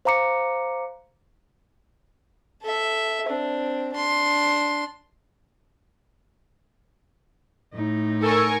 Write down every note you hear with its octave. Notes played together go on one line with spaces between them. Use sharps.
C5 F5 A#5 D6 C#7
A4 E5
C4 D4
D4 C6
A2 D#4
A4 A#4 G#5 C#6